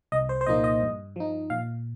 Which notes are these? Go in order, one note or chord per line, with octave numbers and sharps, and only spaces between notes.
C2 D#5
C5
C5
A#2 F3 A#3 D#4 D#5
D#5
G2
F3 D#4
A#2 F5